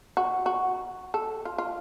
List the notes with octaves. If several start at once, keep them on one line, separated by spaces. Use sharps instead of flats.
F#4
F#4
A4
F4
F4